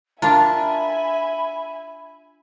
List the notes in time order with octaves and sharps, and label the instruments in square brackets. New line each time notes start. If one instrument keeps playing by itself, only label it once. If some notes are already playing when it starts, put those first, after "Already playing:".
[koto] D4 F4 [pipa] A#4 A5 [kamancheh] E5 G#5 [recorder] B5